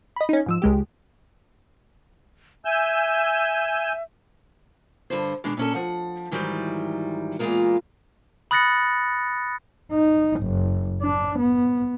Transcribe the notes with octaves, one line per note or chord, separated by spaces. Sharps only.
D#5 B5
C#4 D#4
G#2 F3 E6
C#2 G#3 G4
E5 G#5 E6 G6
G2 D3 C5
B2 D#3 G#3 D4
A#2 C#4 A4
F3 F#5
G#2 D#3 E3 F#3 G3
E2 A#2 E3 G#3 F4 A#4
B5 D#6 F#6 A6 A#6 C#7
D#4
F#1
D4
B3